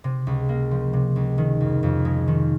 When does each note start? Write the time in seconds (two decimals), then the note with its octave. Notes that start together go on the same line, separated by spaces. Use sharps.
0.04 C3
0.27 C#2
0.49 A#3
0.71 F3
0.93 C3
1.16 C#2
1.38 D#3
1.60 F2
1.83 F2
2.05 G#3
2.28 D#3